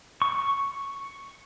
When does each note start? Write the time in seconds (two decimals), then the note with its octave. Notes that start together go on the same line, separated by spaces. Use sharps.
0.22 C#6